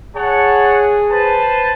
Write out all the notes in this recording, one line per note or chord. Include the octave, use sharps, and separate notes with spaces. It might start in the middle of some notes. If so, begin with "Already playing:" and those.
G#4 C#5 F#5 A5
B4 C5 A5